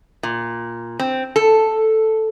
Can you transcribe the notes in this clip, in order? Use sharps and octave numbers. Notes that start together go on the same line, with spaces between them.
A#2
C4
A4